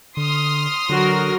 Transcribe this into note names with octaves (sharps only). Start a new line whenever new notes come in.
D3 C6 D#6 F6
D3 F#3 F#4 A#4